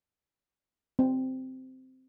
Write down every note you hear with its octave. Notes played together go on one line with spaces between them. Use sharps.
C4